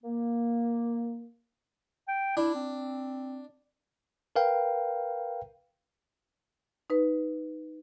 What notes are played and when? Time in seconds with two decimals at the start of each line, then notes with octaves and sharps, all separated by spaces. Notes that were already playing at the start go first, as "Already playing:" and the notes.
0.03 A#3
2.08 G5
2.37 D4 E4
2.55 C4
4.36 A#4 B4 F5 G5
6.90 D#4 B4